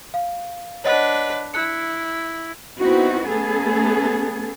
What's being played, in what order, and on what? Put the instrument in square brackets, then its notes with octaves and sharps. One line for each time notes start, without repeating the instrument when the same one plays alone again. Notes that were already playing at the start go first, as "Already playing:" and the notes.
[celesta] F5
[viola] D4 B4 [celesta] C#5 D#5 F#5
[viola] E4 [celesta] F#6 C#7
[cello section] B3 C4 D#4 E4 F#4
A3 B3 C#4 G#4 A4